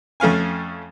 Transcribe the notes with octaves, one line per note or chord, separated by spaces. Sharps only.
F2 A3 C#4 F5 G#5